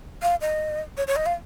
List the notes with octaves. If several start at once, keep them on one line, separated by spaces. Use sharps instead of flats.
F5
D#5
C#5
C#5
D#5
F5